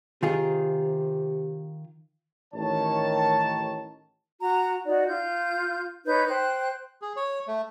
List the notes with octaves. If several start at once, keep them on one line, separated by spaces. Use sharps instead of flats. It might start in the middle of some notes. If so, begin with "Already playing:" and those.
C3 D#3 F4 G#4
A1 D#3 C#5 A5
F#4 A#5
D#4 F#4 D5
F4 G6
D#4 B4 C#5 G6
C5 G5 F#6
G#4
C#5
A3